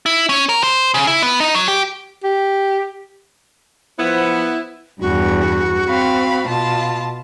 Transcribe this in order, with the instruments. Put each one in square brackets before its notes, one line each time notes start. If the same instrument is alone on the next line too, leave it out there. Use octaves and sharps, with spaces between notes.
[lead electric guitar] E4
C#4
A#4
C5
C#3
E4
B3
D#4
F#3
G4
[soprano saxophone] G4
[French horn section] F3 C5 [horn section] B3 [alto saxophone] E4
[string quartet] E2 G2 [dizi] F#4
[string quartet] C4 F5 B5
B2 F4 A5